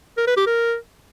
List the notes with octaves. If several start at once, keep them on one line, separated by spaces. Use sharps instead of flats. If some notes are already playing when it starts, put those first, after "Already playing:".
A#4
B4
G4
A#4